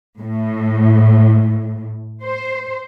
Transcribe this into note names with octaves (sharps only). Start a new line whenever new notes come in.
A2
C5